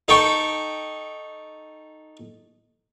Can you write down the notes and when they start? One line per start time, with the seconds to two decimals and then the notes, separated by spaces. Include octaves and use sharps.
0.08 D#4 A4 G5 C#6